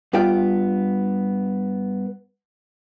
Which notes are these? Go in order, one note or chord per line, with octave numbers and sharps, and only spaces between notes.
G2 B3 F4 G5